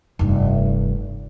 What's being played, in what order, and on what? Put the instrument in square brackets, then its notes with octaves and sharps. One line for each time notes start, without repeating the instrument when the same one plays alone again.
[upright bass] F1 G2